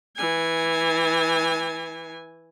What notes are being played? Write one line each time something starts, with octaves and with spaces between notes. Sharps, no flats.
E3 G#5